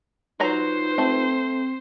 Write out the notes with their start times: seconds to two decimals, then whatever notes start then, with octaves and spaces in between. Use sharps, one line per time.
0.40 F#3 D#4 F4 F#4 B4 C5 A#5
0.98 A3 C4